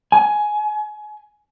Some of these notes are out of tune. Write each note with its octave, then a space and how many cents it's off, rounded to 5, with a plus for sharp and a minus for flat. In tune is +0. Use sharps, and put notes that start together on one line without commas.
G#5 +15